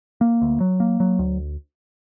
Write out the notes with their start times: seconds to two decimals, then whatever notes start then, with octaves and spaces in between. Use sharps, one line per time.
0.21 A#3
0.42 D2
0.60 F#3
0.80 A#3
1.00 F#3
1.19 D2